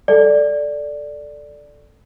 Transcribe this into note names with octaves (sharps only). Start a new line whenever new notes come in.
A4 D5